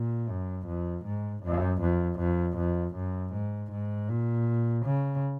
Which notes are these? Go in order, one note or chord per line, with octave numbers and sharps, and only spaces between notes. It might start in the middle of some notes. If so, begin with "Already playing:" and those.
Already playing: A#2
F#2
F2
G#2
F#2
F2
F2
F2
F#2
G#2
G#2
A#2
C#3